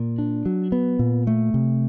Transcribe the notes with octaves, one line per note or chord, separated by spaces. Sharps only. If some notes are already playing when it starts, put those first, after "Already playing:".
Already playing: A#2
D4
F#3
B3
A#2
A3
C3